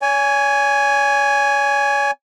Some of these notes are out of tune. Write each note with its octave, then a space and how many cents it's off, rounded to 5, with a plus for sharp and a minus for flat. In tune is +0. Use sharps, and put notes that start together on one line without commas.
C#5 +40 G#5 +0